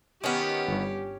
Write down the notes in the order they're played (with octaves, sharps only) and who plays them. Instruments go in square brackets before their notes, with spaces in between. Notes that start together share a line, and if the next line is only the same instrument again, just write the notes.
[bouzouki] D#3 B3 [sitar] C#4 [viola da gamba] G4
[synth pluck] G1 G2